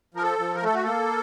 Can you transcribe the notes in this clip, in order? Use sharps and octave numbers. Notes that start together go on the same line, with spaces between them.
F3 A#4
A4
F3
A#4
A3 A4
F#4
A#3 A4